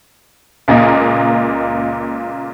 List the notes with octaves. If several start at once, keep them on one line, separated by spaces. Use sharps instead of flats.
C#2 A#2 A#3 D#5